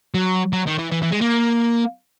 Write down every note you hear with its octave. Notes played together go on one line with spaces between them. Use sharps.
F#3
F#3
D#3
E3
E3
E3
G#3
A#3